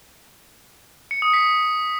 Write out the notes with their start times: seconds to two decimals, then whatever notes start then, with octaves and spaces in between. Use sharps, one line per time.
1.11 C#7
1.22 D#6
1.33 B6